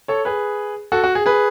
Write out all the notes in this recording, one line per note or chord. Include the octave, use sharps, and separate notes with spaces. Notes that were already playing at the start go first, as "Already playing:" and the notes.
A4 C#5
G#4 B4
F#4 A4
F#4
G#4
G#4 B4